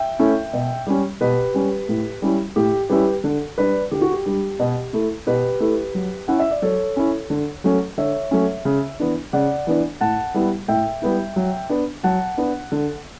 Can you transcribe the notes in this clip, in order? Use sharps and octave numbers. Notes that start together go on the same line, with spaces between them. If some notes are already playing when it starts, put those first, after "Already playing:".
Already playing: E5 G5
A3 C#4 E4
B2
G3 C#4
B2 G4 B4
G3 C#4
A2
G3 C#4 E4
A2 G4
G3 C#4 E4 G4 B4
D3
G3 D4 B4 D5
D3 G4
F#4
G4
G3 D4
B2
A3 E4
B2 G4 B4
A3 E4
F#3
C#4 E4 F#5
E5
D5
F#3 A4 C#5
C#4 E4
D3
F#3 A3 C#4
D3 C#5 E5
F#3 A3 C#4
C#3
E3 B3 D4
C#3 D5 F#5
E3 B3 D4
A2 F#5 A5
G3 B3 E4
A2 E5 G5
G3 B3 E4
F#3
B3 D4
F#3 F#5 A5
B3 D4
D3